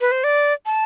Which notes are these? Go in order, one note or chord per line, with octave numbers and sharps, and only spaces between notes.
B4
C5
D5
A5